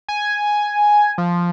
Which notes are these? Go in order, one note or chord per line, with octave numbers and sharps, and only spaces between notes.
G#5
F3